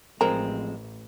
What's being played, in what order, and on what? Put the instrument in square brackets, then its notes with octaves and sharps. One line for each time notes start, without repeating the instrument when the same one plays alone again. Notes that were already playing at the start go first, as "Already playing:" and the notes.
[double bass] A1 [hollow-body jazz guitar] F3 G#3 C4 [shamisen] A#4